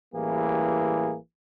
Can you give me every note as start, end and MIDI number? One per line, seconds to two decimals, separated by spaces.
0.13 1.16 33
0.13 1.16 52
0.13 1.16 55
0.13 1.16 58
0.13 1.16 68